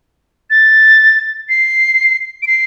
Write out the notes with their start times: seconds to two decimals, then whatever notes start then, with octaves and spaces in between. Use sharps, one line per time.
0.50 A6
1.49 C7
2.42 D7
2.47 C7